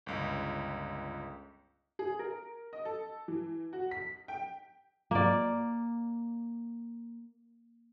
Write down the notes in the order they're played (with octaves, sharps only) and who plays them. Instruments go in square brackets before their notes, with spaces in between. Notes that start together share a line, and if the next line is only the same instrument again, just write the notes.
[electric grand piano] G1 C#2
[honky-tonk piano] G#4
A#4
D#5
A4
E3
F#4
B6
G5
[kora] A#3 D5